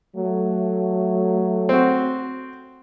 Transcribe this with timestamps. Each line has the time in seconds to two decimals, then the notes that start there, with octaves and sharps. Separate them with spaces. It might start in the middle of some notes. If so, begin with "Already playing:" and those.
0.16 F#3 A3
1.69 C4 F#4